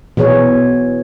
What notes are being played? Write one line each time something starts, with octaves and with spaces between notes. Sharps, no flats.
B2 E3 B3 G#4 C#5